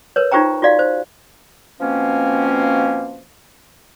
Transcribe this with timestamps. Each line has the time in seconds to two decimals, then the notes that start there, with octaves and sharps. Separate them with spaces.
0.16 A#4 B4 C#5
0.32 D#4 F4 G4 C5 G5 A#5
0.62 F4 F#4 D5 F5
0.79 C5
1.81 B2 F3 A#3 C4 C#4